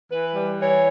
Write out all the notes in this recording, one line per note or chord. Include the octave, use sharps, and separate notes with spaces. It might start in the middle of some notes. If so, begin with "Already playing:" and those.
E3 B4
G3
E3 C#5